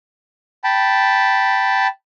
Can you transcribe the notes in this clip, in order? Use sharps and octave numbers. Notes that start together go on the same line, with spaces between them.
G5 A5 B5